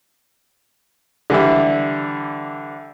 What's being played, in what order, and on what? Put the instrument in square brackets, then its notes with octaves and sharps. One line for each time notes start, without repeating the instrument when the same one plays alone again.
[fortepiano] D3 E3 G3 E4